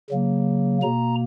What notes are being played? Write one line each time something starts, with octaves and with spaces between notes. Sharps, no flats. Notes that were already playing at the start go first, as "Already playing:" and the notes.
C#3 F#3 A#3
B2 A#3 A#5